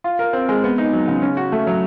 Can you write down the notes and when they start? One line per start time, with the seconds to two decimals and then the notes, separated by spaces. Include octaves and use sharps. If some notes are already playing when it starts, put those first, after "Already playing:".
0.04 F4
0.19 A#4
0.33 C4
0.49 G#3
0.64 B3
0.78 D#4
0.93 F#3
1.08 C#3
1.22 C#4
1.37 F#4
1.52 A3
1.67 F#3